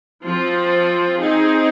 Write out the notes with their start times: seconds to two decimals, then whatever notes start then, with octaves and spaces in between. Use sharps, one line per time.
0.24 F3 C4 F4 C5
1.19 C4 D#4 G#4